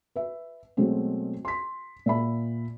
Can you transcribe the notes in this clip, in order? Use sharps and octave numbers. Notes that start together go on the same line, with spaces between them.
B4 E5
B2 F#3 G#3 A3 C4
C6 B6
A#2 E5 B5